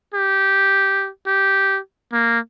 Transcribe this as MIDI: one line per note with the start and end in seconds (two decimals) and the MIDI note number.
0.14 1.09 67
1.27 1.79 67
2.13 2.39 58